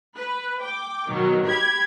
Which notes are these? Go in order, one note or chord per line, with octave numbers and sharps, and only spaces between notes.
B4
G5 D6
B2 D#3 F#3
G4 B5 G#6